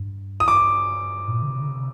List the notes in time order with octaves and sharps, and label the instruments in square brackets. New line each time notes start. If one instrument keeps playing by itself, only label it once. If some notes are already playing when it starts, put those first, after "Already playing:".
Already playing: [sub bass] G2
[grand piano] D#6
D6
[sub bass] A#2
D3
C3
D3
C3